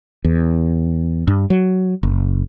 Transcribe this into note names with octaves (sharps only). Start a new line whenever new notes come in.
E2
G2
F#3
F#1